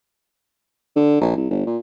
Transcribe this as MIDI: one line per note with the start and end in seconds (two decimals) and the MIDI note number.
0.96 1.18 50
1.21 1.35 34
1.36 1.48 36
1.50 1.64 31
1.67 1.77 46